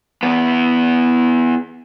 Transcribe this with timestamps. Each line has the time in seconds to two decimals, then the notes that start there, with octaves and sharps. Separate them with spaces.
0.23 E2 B3